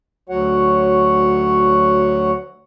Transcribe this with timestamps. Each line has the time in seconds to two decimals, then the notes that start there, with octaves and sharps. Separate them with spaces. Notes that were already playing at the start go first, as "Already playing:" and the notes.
0.29 D2 F#3 F#4 C#5 F#5